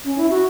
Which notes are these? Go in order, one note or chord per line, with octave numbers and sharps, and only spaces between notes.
C#4
E4
F#4